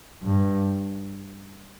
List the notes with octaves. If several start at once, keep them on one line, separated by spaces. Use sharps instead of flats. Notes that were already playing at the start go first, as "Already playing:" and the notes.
G2